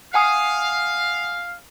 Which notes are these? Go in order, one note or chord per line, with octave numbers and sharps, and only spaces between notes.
F5 F#5 G#5 D#6